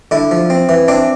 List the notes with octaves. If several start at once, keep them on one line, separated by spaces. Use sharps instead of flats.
D3 E4
F3
C4
E3
C4 D4